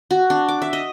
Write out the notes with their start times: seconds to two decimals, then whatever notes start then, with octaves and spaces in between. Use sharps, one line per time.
0.11 F#4
0.30 D4
0.49 D6
0.62 E5
0.73 D#5